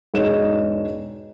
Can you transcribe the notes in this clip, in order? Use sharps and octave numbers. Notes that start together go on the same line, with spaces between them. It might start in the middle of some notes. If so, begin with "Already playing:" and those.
E1 G#2 D#4 C#5 E7